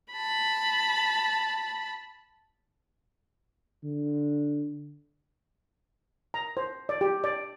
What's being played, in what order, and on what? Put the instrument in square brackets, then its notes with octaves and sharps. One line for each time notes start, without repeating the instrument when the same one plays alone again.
[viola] A5 B5
[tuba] D3
[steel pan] A#5
C5
D5
G4
D5